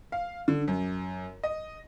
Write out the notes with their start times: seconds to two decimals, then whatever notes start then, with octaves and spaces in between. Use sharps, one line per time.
0.12 F5
0.48 D3
0.68 F#2
1.43 D#5